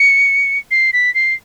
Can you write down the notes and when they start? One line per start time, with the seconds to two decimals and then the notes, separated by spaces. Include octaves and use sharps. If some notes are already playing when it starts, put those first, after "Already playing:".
Already playing: C#7
0.71 C7
0.93 B6
1.15 C7